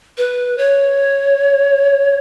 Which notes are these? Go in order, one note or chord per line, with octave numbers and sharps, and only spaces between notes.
B4
C#5